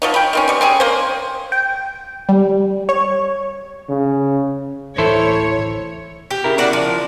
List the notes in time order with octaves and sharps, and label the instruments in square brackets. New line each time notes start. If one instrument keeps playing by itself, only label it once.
[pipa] F3 F#3 D#4
G5 B5
D#3 C4 C#4
G3 B3
C4 C#4 G#4
A#3 C5
[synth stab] G5
G3
C#5
[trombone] C#3
[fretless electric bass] D1 A1 E3 [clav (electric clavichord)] E4 A4 C5 [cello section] C#5
[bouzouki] G4
[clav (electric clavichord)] C#3 E4 A#4
[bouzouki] D4 F#4 D5
F3